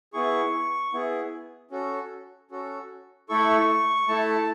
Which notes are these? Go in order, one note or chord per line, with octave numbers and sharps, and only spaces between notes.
B3 E4 G#4 C#6
B3 E4 G#4
C#4 F#4 A4
C#4 F#4 A4
A3 E4 A4 C#6
A3 E4 A4 A5